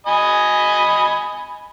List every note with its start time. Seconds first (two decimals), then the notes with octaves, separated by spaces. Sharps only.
0.07 D#5 G#5 B5